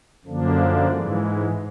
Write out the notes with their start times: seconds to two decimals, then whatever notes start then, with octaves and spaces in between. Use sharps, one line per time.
0.25 F#2 D3 F3 A#3 D4
0.87 G#2 E3 G#3